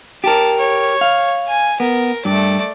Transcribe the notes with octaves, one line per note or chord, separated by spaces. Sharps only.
G4 A#4 A5
C#5
F5
G#5
B3 A#4
G2 A3 D5